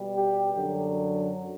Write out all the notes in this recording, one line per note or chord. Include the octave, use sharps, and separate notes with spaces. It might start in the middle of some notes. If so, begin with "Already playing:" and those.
Already playing: B2 G3
G4
F#2 D3 F#3